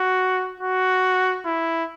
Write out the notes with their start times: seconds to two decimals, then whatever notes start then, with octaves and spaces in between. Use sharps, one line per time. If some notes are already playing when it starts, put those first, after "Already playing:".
Already playing: F#4
0.60 F#4
1.46 E4